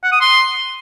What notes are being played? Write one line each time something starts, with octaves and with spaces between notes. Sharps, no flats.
F#5
D#6
C6